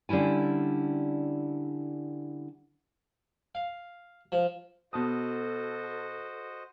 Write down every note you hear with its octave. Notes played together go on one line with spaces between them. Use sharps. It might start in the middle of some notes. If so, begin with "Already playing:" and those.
D3 G3 C#4 E4 G#5
F5
F3
B2 F#4 A4 C5 D#5 A5 D#6